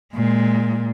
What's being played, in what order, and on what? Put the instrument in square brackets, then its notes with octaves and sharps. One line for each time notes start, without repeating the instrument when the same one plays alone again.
[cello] A#2 [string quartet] G#3